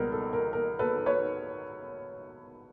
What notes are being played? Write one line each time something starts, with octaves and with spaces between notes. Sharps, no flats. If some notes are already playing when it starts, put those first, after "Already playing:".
Already playing: C#2 B2 G3 B3 A#4
A4
A#4
A#4
A4 B4
B4 C#5